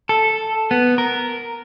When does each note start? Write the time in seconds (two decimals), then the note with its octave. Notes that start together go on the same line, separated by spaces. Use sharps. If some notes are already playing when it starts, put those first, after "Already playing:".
0.09 A4
0.71 B3
0.98 A#4